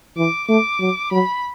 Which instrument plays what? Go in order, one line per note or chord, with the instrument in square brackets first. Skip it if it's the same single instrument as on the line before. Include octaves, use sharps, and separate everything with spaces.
[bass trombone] E3 [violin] D6
[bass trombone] A3 [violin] D6
[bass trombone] F#3
[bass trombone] F#3 [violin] B5